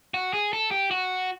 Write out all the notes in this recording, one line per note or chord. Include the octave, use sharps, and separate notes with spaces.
F#4
G#4
A4
G4
F#4